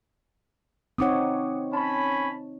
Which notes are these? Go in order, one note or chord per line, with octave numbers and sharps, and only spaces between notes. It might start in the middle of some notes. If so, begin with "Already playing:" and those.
C4 D#4 C#5 F#5 D6 D#6
C#4 A5 B5